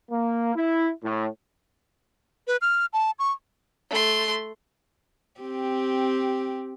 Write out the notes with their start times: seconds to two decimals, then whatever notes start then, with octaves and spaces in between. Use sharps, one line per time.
0.11 A#3
0.56 E4
1.04 A2
2.47 B4
2.61 F6
2.93 A5
3.19 C#6
3.90 A3 C6
5.40 C4 G4